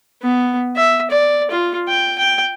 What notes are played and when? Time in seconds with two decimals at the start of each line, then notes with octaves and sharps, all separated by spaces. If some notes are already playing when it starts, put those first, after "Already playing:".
0.23 B3
0.76 E5
1.10 D5
1.51 F4
1.88 G5
2.18 G5